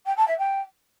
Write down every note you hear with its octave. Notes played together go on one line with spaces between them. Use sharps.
G5
A5
E5
G5